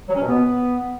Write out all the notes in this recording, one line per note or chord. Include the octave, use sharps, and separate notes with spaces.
F#3
C#4
B2
B3